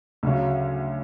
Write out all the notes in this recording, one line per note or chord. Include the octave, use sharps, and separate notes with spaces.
D2 C#3 F#3 C#4